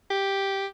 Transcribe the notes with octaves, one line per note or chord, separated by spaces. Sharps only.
G4